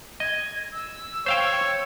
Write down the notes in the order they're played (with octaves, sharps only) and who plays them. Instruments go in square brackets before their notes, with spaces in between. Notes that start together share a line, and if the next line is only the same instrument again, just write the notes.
[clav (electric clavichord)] D#5 [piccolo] G#6
[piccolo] E6
[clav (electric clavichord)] C5 F5 G5 [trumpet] C#5